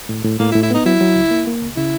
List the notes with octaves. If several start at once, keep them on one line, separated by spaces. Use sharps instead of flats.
A2
A2
A2 A#3
E4
A2
E4
B3 D#4
F#3 E4
F#3
C#2
A#3
A#3
C#2
C#3 E4